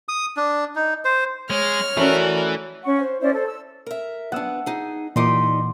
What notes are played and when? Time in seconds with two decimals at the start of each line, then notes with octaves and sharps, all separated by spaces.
0.09 D#6
0.37 D4
0.75 D#4
1.05 C5
1.50 G#3 C#5 F6
1.97 E3 A3 C#4 F#4 A#4 B4 D5
2.84 C#4 F#5 C#6
2.99 C5
3.20 C#4 E4 C5 D5
3.33 A4 C5
3.46 E6
3.86 A#4 E5
4.32 B3 D4 F#5 E6
4.66 D#4 G#4
5.16 A#2 E3 G3 D#4 D#5 C6 D6 B6